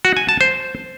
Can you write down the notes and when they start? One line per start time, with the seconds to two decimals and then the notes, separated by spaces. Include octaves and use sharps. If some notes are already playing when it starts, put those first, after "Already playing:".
0.05 F#4
0.17 G#5
0.29 A5
0.41 C5